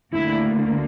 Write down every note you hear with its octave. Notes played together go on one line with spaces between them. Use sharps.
D2 D3 A#3 E4